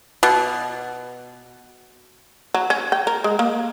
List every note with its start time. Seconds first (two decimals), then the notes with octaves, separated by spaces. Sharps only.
0.23 B2
2.54 F#3
2.70 C#4
2.92 G5
3.07 A#4
3.24 G#3
3.39 A#3